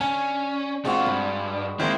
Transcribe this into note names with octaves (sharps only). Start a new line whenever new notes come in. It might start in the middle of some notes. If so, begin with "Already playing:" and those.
D3 C#4 G#5
A#2 G#3 C4 D4 F4 F#4
G2 B5
D#3 G#3 A#3 C4 E4